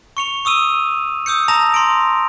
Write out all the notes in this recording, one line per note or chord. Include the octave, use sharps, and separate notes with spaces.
C#6 C#7 F7
C#6 D#6 E6 D#7
D#6 E6 G6 C#7
A5 A#5 D#6 A#6 F7
C6 D7